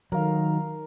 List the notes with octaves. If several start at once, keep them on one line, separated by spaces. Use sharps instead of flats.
D#3 F#3 A#4 F5